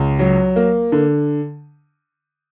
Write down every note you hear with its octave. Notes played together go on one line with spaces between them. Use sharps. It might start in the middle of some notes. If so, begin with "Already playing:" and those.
Already playing: C#2
F#3
A#3
D3